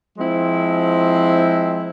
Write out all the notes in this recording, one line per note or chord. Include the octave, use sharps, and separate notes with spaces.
F3 G#3 C4 E4